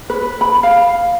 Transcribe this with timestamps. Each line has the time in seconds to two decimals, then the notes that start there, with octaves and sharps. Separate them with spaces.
0.10 B4
0.41 B5
0.63 F5